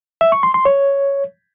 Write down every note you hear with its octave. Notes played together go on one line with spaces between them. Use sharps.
E5
C#6
C6
C6
C#5